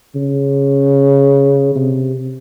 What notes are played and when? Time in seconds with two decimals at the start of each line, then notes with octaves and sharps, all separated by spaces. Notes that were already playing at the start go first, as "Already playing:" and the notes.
0.15 C#3
1.76 C3